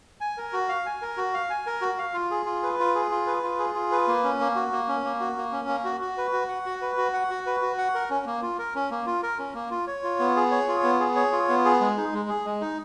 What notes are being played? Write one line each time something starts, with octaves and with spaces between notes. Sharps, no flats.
G#5
A#4
F#4
F5
G#5
A#4
F#4
F5
G#5
A#4
F#4
F5
F4
G#4
F4
B4
F4
G#4
F4
B4
F4
G#4
F4
B4
A#3
C#4
A#3
F#4
A#3
C#4
A#3
F#4
A#3
C#4
A#3
F#4
F#4
B4
F#4
F#5
F#4
B4
F#4
F#5
F#4
B4
F#4
F#5
A#4
C#4
A#3
F4
A#4
C#4
A#3
F4
A#4
C#4
A#3
F4
C#5
F4
B3
G#4
C#5
F4
B3
G#4
C#5
F4
B3
G#4
G#3
D#4
G#3
G#4
G#3
D#4